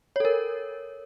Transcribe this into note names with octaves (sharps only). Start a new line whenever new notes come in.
A4 A#4 C#5